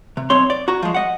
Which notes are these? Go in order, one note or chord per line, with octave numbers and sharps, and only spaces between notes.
C3
B1 C4 C#5 C6
D5
F#4 A#5
F3 G#3
D#5 F#5